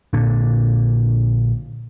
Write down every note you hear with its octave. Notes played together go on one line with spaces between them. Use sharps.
A#1 A#2 D3